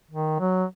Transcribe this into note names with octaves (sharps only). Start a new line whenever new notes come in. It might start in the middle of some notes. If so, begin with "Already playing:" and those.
D#3
F#3